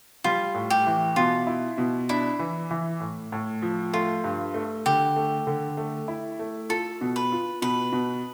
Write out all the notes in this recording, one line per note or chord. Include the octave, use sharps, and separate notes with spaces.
G3 F4
A2
G4
E3
B2 F4
E4
B2
D4 E4
E3
E3
A2
A2
F3
A3 F4
G2
A3
D3 G4
A3
D3
A3
E4
A3
F4 A4
B2
B4
F4
B2 B4
B2